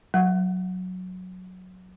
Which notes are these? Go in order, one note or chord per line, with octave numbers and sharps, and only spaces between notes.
F#3 F#5